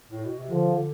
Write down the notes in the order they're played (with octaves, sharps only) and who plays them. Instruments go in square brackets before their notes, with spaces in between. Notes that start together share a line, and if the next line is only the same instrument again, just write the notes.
[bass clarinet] A2
B2
C3
[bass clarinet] D3 [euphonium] F3
[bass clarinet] D3